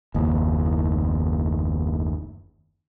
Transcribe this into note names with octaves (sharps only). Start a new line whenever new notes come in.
F#1 D#2